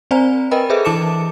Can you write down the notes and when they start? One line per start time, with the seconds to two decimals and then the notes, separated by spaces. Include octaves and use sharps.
0.11 C4 C5 D5 G#5 A#5
0.51 A#4 B4 D#5 G5 B5
0.70 G#4 A4 B4 C5 E5
0.85 E3 E4 A5 D6 C#7 E7